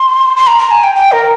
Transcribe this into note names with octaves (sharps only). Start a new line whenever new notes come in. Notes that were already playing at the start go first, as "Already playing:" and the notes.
Already playing: C6
C6
A#5
A#5
G#5
G5
G5
A#4